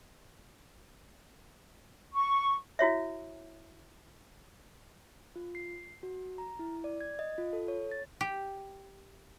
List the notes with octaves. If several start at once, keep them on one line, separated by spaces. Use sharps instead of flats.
C#6
E4 F#4 C#5 E5
F4
C7
F#4
A#5
E4
D5
G#6
D#5
F4
A4
C#5
A6
G4